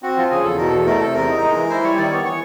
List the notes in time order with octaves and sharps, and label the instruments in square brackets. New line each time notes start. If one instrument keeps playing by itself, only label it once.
[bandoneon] C4 [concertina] F#4
[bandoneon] F3 [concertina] F4
[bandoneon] C#3 [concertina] G#4
[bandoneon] E2 [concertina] A4
[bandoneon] B2 [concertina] A#4
[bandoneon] E2 [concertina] A4
[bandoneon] A3 [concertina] A#4
[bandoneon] C3 [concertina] A4
[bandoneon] E2 [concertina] A#4
[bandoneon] D#4
G#3
E3
[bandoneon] E4 [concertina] C5
[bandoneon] G3 [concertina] C#5
[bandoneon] D#3 [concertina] D5
[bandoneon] B3 [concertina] C#5
[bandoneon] E3 [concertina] C#5